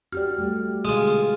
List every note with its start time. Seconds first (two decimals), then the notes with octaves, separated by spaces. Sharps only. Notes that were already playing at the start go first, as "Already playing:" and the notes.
0.12 F#4 G4 D5 F6
0.38 G3 A3
0.85 B2 D3 G#3 B3 F4 D#6